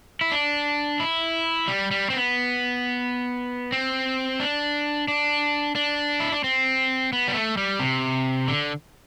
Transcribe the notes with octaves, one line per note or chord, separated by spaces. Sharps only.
E4
D4
E4
G3
G3
C4
B3
C4
D4
D4
D4
E4
D4
C4
B3
G3
A3
G3
C3
D3